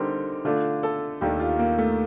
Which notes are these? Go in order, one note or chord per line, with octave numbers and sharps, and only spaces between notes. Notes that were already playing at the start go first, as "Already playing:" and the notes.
Already playing: D3 G3 C4 D4 D#4 G4 A#4
D3 A3 D4 F4
A4
D#2 D#3 A3 D4 G4
F4
A#3
A3